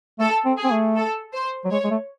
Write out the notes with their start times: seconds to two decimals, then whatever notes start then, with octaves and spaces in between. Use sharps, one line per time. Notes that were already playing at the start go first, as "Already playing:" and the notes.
0.19 A3 A4
0.45 C4
0.58 G#4
0.64 C4
0.71 A3
0.96 A4
1.33 C5
1.65 F#3
1.71 G#3 C#5
1.84 G#3
1.91 A3